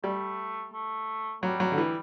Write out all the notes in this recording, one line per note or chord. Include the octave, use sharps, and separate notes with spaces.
G3 A3
A3
F#3 G3
F#3
D3
E3